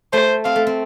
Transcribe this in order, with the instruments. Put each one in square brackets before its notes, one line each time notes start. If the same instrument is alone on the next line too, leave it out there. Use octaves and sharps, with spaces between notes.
[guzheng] A3 [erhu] C5
[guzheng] C4 [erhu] F5
[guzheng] A3
C4